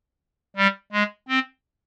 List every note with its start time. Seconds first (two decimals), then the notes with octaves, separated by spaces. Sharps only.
0.56 G3
0.92 G#3
1.28 C4